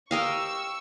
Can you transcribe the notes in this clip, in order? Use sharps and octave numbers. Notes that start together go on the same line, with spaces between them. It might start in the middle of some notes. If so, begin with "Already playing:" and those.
G4 A#4 D#5 F5 C#6 E6